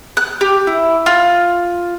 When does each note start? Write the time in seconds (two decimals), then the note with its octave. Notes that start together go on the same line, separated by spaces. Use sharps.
0.17 F#6
0.41 G4
0.67 E4
1.06 F4